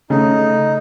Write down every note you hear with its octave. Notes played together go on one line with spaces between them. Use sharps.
C#3 A3 D#4